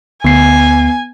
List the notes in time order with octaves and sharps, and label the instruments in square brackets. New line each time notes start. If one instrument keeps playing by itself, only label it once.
[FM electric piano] D2 [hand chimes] B3 C7 [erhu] G#5